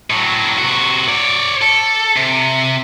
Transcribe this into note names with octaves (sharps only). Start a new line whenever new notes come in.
A2 F#3
C3 F#4
C#5 D5
A4
C3